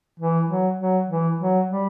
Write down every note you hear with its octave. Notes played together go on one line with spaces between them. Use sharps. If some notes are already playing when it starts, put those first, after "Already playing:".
E3
F#3
F#3
E3
F#3
G3